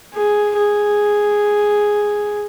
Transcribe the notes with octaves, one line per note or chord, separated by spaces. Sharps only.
G#4
G#4